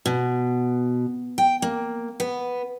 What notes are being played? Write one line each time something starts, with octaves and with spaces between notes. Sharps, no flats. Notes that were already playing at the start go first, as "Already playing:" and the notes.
B2
G5
A#3
B3